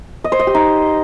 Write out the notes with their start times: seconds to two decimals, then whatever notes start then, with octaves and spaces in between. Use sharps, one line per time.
0.24 D#5
0.32 C5
0.39 D#5
0.47 G4
0.55 D#4